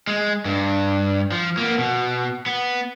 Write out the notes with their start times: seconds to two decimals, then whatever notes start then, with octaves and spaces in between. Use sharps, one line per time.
0.07 G#3
0.45 G2
1.32 F3
1.57 A#3 B3
1.78 B2
2.46 B3